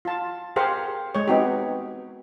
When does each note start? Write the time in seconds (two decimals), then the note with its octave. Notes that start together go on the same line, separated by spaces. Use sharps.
0.05 F4 A5
0.56 G4 G#4 A#4 C5 F5 F#5
1.15 G#3 C#5
1.28 B3 C4 D#4 F#4 G4